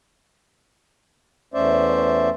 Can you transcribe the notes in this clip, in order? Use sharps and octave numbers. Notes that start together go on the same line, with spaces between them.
E2 A3 C#4 C5 D5 E5